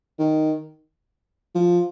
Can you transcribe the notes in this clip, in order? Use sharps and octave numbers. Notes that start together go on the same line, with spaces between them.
D#3
F3